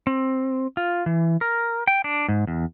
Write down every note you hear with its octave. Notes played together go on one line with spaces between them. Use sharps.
C4
F4
E3
A#4
G5
D4
G#2
E2